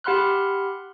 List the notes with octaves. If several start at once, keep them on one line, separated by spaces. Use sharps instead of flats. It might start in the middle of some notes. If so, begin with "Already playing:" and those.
G4 F#5 B5 C6 F6 F#6